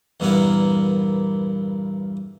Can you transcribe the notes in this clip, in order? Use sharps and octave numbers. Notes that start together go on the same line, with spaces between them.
E2 G2 A#2 A#3 B3 E4